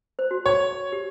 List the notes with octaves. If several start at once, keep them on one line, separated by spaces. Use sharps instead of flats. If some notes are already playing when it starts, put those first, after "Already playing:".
C5
F#4
C#5
G4